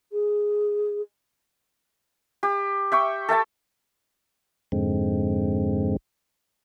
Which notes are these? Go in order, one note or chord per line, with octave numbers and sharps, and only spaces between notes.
G#4
G4
E5 G5 C#6
A4 E5 G5 A5
F2 G#2 D3 G#3 C4